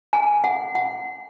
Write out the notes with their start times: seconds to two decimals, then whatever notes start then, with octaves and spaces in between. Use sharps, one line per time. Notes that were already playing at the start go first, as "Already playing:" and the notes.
0.13 G#5
0.44 F#5
0.75 F#5